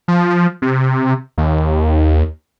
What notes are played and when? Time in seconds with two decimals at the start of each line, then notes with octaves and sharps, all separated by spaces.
0.08 F3
0.62 C3
1.38 D#2